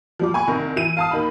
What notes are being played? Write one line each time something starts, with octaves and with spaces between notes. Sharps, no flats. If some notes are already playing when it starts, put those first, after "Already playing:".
F3 G3 D6
G#5 B5 C#6
C2 D#3 A#4
E3 E4 D#7
F5 A5 D#6
D#2 D#3 B5